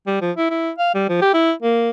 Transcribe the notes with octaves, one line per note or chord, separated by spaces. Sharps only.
G3
F3
E4
E4
F5
G3
F3
G4
E4
A#3